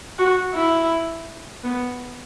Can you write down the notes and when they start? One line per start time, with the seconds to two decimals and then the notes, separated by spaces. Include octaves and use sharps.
0.19 F#4
0.55 E4
1.64 B3